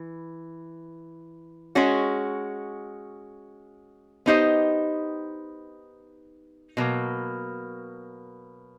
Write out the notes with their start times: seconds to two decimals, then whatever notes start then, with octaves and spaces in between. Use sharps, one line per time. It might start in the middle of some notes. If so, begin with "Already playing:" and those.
Already playing: E3
1.75 G#3 C#4 F#4
4.26 B3 D#4 G4 C5 D#5
6.77 B2 F#3 A#3